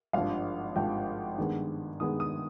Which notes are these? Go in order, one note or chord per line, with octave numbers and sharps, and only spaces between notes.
G#1 G2 F3 F5
G#1 G2 F3 G5
G2 D#3 G#3 B3
G2 D#3 G#3 B3 D#6
D#6